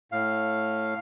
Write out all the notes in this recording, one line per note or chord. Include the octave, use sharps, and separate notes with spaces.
A2 F5